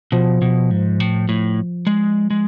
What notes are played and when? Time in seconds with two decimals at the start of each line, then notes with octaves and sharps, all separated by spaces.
0.12 B2 F3
0.42 B2
0.71 G#2
1.00 A2
1.29 A2
1.87 G#3
2.30 G#3